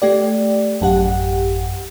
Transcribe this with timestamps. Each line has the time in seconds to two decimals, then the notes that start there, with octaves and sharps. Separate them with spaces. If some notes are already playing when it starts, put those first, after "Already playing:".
0.02 A3 G4 D5
0.81 A1 F#2 G4 F#5